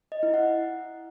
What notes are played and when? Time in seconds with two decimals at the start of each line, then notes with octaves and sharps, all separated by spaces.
0.12 D#5
0.23 E4
0.34 F#5